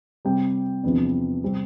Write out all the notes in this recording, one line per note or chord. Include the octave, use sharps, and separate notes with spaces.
C3 G3 C4 G5
E2 C3 F3 B3 D4
C3 G3 C4